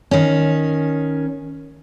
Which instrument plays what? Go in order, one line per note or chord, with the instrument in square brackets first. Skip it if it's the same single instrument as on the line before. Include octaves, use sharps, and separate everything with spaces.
[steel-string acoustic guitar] D#3 C#4